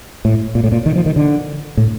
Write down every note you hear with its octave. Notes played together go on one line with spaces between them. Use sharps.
A2
A#2
A2
A#2
D#3
F3
D#3
D3
A2